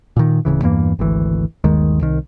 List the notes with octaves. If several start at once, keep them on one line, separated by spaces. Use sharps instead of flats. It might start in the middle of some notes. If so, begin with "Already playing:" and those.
A#2 D#3
D1 D#2 C#3 E3
E2 G2 E3 A#3
G#1 D2 E3
G1 D#2 D#3 G#3
C2 D#3